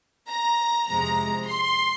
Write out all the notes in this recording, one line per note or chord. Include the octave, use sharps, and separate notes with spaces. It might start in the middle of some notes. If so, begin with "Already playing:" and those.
A#5
F2 C3 G#3 A#5
C6